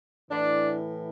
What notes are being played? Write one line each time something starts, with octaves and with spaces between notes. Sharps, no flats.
A2 E3 D4